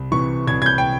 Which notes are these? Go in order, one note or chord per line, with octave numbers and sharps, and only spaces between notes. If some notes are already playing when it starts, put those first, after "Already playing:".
Already playing: C2
C3 E3 C#6
C2 G#6
G#6
G6
G5